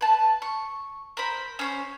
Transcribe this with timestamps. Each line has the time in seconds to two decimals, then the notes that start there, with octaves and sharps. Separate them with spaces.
0.01 B4 A5
0.42 C#6
1.17 A#4 C5 B5
1.59 C#4 C5 C#5